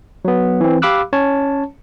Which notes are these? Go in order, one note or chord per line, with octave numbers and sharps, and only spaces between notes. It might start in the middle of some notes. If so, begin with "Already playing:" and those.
F#3 B3
E3 C4
G4 F5 B5 D6 E6 F#6
C#4 C#5 A5